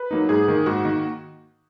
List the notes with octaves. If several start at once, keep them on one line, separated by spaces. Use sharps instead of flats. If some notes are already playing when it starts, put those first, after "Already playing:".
Already playing: B4
F#3 A#3 D#4
G#2 G#4
D#3 A#3
G#2 F#4
D#3 A#3